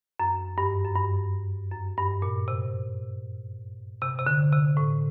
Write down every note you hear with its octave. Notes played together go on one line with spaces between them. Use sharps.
F#2
G2
F#2
G2
F#2
G2
A#2
C3
C3
C3
D3
C3
A2